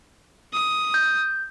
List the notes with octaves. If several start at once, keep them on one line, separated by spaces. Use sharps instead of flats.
D#6
G6